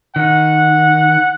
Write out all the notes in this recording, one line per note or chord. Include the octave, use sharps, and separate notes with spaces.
D#3 F#5